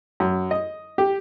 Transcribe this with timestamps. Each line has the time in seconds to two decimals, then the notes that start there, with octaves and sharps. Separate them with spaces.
0.20 F#2
0.51 D#5
0.98 G4